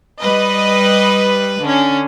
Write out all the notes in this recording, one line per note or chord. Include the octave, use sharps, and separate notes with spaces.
G3 B4 D#5
D3 C#4